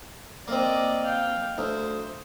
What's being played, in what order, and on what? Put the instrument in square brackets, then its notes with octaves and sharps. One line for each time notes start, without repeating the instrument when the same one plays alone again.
[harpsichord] A#3 C4 [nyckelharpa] D5 D#5
[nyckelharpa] F5 G5
[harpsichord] D2 [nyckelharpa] C5